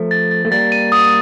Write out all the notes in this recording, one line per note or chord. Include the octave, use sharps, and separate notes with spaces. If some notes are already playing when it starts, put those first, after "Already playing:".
Already playing: F3 A3
A6
A6
A3
G3 A#3 A6
D#7
D#6